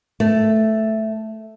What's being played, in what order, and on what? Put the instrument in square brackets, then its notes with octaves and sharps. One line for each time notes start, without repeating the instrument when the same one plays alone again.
[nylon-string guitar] A3